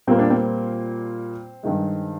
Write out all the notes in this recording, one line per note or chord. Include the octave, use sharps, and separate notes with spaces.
A#2 G3 A#3 C4
D4
C4
G2 D#3 G#3